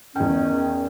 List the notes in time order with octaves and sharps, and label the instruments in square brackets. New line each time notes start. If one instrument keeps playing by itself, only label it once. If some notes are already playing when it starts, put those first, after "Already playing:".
[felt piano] E2 G5 [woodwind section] D#3 C#4